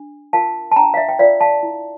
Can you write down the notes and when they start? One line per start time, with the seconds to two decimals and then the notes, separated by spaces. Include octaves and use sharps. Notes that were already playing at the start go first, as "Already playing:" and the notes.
Already playing: D4
0.33 F4 A#4 F5 A5
0.72 A5
0.76 D4 G5 A#5
0.94 F5
0.97 E5
1.09 G5
1.19 F4 A#4 D5 F5
1.41 F5 A5
1.63 E4